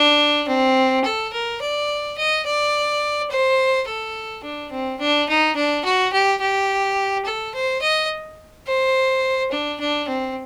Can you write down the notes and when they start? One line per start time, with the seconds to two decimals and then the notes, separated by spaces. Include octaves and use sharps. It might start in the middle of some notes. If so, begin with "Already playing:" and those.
Already playing: D4
0.48 C4
1.04 A4
1.33 A#4
1.61 D5
2.18 D#5
2.45 D5
3.30 C5
3.87 A4
4.43 D4
4.71 C4
5.00 D4
5.29 D#4
5.56 D4
5.84 F#4
6.13 G4
6.41 G4
7.26 A4
7.54 C5
7.81 D#5
8.67 C5
9.51 D4
9.80 D4
10.08 C4